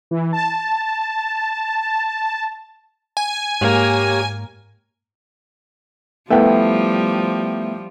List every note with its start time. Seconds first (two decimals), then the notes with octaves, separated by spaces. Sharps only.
0.11 E3
0.33 A5
3.17 G#5
3.61 G#2 A#3 G4 C#5
6.30 F3 G3 A3 B3 E4 G5